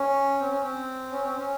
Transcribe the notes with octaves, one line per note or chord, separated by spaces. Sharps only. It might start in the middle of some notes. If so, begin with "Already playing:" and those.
Already playing: C#4
C4
C#4
C4
C#4
C4
C#4